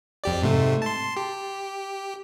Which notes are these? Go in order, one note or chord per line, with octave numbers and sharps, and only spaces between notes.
F2 G4 D5
G#2 C3 A3
A5 C6
G4